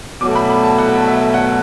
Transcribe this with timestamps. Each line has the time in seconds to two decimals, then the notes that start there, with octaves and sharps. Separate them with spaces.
0.21 B2 F#3 A3 D6
0.35 B5
0.50 B5
0.64 A5
0.78 F#5
1.06 E5
1.34 F#5